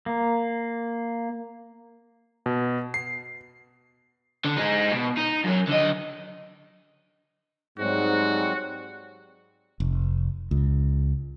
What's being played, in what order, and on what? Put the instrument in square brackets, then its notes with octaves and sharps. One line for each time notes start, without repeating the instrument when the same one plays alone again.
[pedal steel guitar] A#3
[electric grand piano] B2
C7
[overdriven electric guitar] D3
G#3 D#4
B2
D#4
F#2 F#3
D3 D#5
[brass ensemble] G#2 [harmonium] F#3 G3 C4 [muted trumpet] F#4
[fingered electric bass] F1
C#2